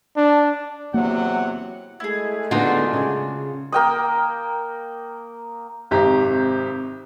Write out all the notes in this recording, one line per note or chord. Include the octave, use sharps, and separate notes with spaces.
D4
E2 C3 F#3 A#3 F#5
G#3 A3 E4 G#4
D3 B3 D4 D#4 F4 F#4
C#3
A#3 G5 D#6
G#1 C3 G4 A#5